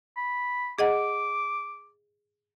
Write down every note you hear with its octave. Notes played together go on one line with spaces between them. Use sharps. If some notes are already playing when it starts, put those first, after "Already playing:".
B5
G#4 D#5 F#5 D6